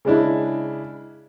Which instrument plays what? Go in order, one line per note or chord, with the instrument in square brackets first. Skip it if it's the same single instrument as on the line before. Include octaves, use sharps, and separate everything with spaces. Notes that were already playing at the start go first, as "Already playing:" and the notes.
[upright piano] C#3 G#3 D4 E4